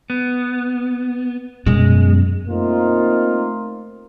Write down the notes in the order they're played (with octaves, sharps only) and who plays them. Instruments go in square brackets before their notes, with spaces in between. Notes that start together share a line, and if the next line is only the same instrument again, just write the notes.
[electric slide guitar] B3
[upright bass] F#2 B2 [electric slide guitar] G#3
[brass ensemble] A3 A#3 C4 D#4 F4